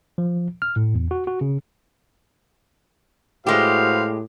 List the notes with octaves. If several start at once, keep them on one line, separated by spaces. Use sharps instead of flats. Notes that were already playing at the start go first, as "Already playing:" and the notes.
F3
F6
A2
E2
F#4
F#4
C#3
A2 G#3 F#4 G4 B4 C5 F5